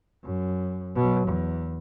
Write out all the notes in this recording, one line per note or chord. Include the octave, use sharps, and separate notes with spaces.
F#2
B2 F#3
E2